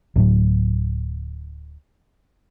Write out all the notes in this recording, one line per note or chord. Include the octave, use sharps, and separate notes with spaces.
D1 A2 F#3